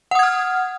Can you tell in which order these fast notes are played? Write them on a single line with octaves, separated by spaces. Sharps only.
F#5 D#6 G#6 F6